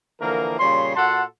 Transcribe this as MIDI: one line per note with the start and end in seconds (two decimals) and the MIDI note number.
0.21 0.56 50
0.21 0.56 52
0.21 0.56 53
0.21 0.56 58
0.21 0.56 70
0.60 0.92 46
0.60 0.92 49
0.60 0.92 55
0.60 0.92 73
0.60 0.92 84
0.96 1.24 46
0.96 1.24 66
0.96 1.24 69
0.96 1.24 78
0.96 1.24 81
0.96 1.24 84